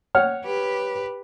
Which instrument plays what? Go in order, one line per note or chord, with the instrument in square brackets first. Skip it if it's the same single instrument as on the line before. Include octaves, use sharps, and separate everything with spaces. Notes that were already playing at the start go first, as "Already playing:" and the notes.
[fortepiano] C#5 F#5 F6
[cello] G4 B4